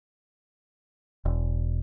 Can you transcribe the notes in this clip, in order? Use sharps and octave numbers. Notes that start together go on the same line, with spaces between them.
E1